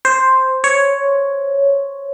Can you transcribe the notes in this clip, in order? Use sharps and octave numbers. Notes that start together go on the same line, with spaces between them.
C5
C#5